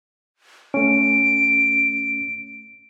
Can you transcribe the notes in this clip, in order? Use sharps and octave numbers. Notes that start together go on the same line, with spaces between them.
A3 C#4 D7